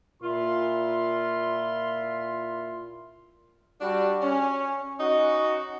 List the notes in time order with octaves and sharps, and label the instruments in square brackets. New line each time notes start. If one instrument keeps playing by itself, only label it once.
[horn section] A#2 E4 F4 C6
G3 D4 F#4
C#4
C#4 D#4 F#4